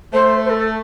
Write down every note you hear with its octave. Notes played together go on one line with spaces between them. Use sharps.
A3 C5
C5
A4